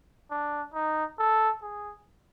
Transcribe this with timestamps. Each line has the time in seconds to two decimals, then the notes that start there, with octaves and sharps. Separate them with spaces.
0.31 D4
0.74 D#4
1.19 A4
1.62 G#4